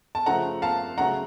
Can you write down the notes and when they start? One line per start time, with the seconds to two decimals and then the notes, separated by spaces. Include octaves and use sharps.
0.15 A5
0.26 C#3 F3 A3 F#5 A#5
0.62 F5 A5
0.98 C#3 F#3 A3 F#5 A#5